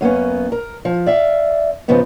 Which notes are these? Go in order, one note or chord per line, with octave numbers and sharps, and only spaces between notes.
F#2 A#3 B3 C#4
A#4
F3
D5 E5 F5
G#2 C#3 F3 B3 D#4